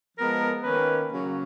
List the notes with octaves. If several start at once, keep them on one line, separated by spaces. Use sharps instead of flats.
F3 G#3 B3 A#4
D#3 A#3 C#4 B4
C#3 F#3 A#3 C#4